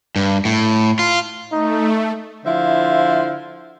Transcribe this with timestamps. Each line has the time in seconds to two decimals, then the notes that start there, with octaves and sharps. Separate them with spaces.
0.16 G2
0.45 A2
0.99 F4
1.52 A3 D#4
2.45 D3 F3 E4 C5 E5 F5